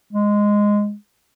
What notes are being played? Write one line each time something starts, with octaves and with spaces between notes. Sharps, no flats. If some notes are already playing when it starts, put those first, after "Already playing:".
G#3